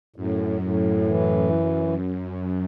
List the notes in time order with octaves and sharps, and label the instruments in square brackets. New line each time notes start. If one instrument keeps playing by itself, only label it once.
[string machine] F#2 [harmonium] A2
[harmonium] A2
[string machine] F#2 [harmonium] E3